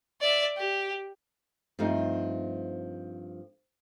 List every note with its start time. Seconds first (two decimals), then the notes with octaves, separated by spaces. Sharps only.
0.21 D5 E5
0.57 G4
1.79 G2 F3 A3 C4 D#4